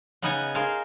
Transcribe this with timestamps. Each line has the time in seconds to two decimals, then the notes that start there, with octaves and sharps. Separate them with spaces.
0.22 C#3 B3 D#4 D#5 F#5 G#5
0.55 G#4 A#4 C5 F5